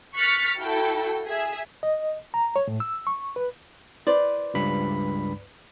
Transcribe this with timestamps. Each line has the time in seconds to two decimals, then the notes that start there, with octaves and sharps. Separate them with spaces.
0.15 C#6 F6 F#6 A6 B6 C#7
0.57 E4 F#4 A4 G5
1.27 G#4 E5
1.83 D#5
2.34 A#5
2.56 C#5
2.67 A2
2.80 E6
3.07 C#6
3.36 B4
4.07 B4 C5 D5
4.54 C#2 G2 B5